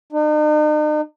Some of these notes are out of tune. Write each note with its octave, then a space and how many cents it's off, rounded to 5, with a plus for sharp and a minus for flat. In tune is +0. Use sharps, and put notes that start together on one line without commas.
D#4 -45